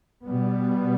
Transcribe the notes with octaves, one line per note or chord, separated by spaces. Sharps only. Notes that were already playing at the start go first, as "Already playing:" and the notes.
B2 G3 B3